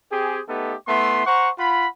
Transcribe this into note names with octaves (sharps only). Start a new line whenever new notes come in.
C4 G4 G#4
A3 B3 D#4 G4 A4
A3 B3 E4 C6
C5 F#5 A#5 C#6
F4 F#5 B5